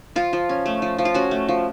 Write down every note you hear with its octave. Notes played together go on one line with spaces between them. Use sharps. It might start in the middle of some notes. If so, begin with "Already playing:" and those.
F3 F4
F3
C#4
A3
F3
F3
F4
C#4 F#4
A3
F3